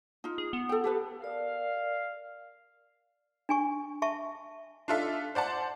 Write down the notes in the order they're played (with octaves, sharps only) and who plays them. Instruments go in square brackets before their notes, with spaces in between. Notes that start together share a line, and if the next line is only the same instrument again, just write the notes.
[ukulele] D#4 F4
[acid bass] G#4
B3
[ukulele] A4 G5
G4 A4 B4
[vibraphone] A#4 D5 [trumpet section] F5
[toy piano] D4 G#5 C#6
E5 A5 C#6
[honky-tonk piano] D4 D#4 F4 A4 E5
C5 D5 F#5 A5